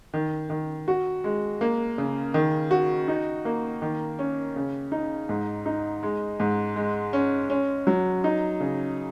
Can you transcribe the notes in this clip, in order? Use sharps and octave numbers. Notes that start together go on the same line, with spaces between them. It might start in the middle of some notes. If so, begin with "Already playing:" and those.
D#3
D#3
F#4
G#3
A#3
C#3
D#3
F#4
D#4
A#3
D#3
C#4
C#3
D#4
G#2
D#4
G#3
G#2
G#3
C#4
C#4
F#3
D#4
C#3